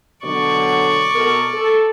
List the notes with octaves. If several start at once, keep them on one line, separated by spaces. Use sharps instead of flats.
B2 D3 F#3 D5 C#6
B2 A4 A#4
A4